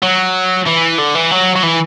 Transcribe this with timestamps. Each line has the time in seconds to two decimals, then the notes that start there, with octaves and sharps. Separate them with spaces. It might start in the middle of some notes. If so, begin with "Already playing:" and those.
0.03 F#3
0.67 E3
0.99 D3
1.15 E3
1.31 F#3
1.56 F#3
1.63 E3